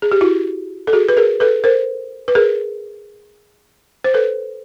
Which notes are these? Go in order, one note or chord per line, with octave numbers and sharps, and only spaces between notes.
G#4
G4
E4 F#4
A4
F#4 G#4
B4
G#4 A#4
A4 B4
A#4 C5
B4
G#4 A#4
C5
A4 B4